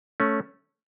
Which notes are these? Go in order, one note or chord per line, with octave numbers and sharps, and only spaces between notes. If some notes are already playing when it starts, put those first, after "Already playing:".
A3 C#4